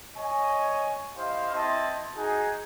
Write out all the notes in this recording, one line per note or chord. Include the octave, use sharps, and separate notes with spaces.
C#5 D#5 G#5
E4 G4 C5 D#5 F5
C4 E4 D#5 A5 C6
D#4 F#4 G#4